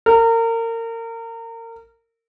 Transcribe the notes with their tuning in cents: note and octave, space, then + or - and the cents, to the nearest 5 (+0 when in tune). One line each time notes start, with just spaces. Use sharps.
A#4 -30